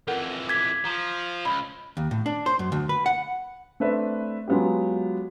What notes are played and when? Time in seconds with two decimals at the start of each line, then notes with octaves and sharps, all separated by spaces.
0.07 F2 E3 A4 A#4 F#5
0.49 D6 G#6 B6
0.85 F3 A#5
1.45 C#2 B5
1.97 D#2
2.11 A2
2.26 D4
2.46 C5
2.59 F#2
2.72 D2
2.89 B4
3.06 F#5
3.80 A3 C4 D4 B4 E5
4.48 F#3 G#3 B3 F4 G4